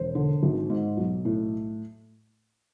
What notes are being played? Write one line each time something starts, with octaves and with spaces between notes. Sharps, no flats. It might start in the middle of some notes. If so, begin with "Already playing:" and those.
Already playing: E1 C5
D3
G#1
G#2
B1
A2